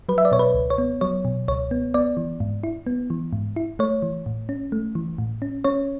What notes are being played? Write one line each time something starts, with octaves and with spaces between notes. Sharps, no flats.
F#3 B4
E5
D5
B2 C#5
B4
C#2
C#5
B3
F#3 C#5
B2
C#2 C#5
B3
B3 D5
E3
G#2
E4
B3
E3
G#2
E4
A3 C#5
E3
A2
C#4
A3
E3
A2
C#4
C#4 C#5